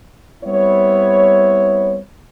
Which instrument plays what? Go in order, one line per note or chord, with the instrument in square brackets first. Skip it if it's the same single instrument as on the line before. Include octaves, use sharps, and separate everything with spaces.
[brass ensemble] G3 B3 C4 E4 C#5